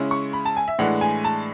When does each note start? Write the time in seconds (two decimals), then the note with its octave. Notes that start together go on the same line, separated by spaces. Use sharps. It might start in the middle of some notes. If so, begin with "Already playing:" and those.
Already playing: C#3 G#3 C#4 E4
0.11 C#6
0.33 B5
0.45 A5
0.57 G#5
0.68 E5
0.79 A2 E3 G#3 D4 F#5
1.01 G#5
1.25 A5